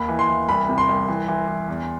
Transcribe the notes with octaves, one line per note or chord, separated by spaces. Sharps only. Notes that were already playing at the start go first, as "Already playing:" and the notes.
Already playing: D#2 B5
E3
C6
E3
C2 B5
C3
C6
C2
E3
E3
E3
E2